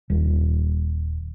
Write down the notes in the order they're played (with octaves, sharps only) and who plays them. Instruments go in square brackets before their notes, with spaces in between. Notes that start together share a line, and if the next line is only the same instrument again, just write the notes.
[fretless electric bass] D#1